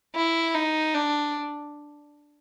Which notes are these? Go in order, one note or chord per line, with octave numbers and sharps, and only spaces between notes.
E4
D#4
D4